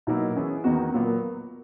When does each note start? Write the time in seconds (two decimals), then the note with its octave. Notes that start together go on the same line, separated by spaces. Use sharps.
0.07 B2 F#3 A#3 D#4 E4
0.35 E3 B3 C#4 E4 G#4
0.64 E2 D#3 A#3 B3 D#4 F#4
0.93 A#2 F#3 A#3 B3